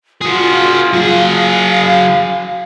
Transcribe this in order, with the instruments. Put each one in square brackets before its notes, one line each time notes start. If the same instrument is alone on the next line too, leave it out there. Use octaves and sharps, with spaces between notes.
[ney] F4 [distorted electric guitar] F#4 G#4
[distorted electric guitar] F#3 G#4 [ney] F5